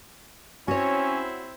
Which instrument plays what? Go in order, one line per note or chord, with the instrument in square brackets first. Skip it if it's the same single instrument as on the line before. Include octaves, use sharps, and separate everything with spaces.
[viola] C4 E4 [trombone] C#4 [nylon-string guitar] F#4 C#5